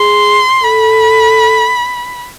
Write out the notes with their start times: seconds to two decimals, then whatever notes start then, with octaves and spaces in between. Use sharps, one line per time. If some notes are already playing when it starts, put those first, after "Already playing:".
Already playing: G#4 C6
0.63 A4 B5